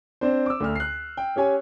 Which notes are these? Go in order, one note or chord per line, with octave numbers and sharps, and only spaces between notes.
C4 D4 C5
D6 E6
D2 D3 F6
F#6 C7
G5
C#4 G4 C#5 G#5